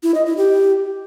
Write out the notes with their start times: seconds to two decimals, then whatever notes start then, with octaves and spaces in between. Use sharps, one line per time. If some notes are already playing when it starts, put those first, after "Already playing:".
0.03 E4
0.14 D#5
0.26 E4
0.37 G4